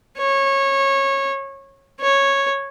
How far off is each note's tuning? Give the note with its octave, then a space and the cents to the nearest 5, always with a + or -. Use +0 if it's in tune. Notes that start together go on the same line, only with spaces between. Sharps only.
C#5 -20
C#5 -10